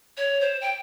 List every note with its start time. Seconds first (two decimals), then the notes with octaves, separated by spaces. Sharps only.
0.17 C#5
0.41 C5
0.61 G5